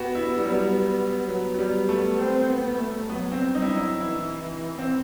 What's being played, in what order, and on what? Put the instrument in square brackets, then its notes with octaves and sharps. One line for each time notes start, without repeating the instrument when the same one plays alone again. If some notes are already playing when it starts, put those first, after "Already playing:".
Already playing: [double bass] B3 [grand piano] F#4 G4
[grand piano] E4
G3
F#3
G3
[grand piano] F#3 [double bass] B3
[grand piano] F#3
G3
A3
[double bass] C4
B3
A3
[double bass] F#3 [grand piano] B3
[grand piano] C4
[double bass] G3
[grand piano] D#4
E4
[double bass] F#3 [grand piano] D#4
[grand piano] E4
[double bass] E3 [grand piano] E4
[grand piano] C4